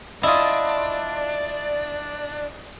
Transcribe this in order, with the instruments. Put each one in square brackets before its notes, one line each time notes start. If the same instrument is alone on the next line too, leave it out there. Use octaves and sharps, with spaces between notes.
[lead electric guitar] D4 [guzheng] E4 F4 [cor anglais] D5 [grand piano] D#5 D#6